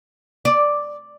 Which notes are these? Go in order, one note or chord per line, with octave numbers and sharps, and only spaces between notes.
D5